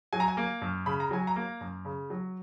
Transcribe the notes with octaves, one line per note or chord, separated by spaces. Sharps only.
F#3 G#5
A#5
G#5
A#3
F#2
C#3 B5
A#5
F#3 G#5
A#5
A#3
F#2
C#3
F#3